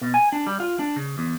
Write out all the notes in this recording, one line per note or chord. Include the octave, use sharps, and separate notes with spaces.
B2
G#5
D4
G3
F4
D4
C#3
E2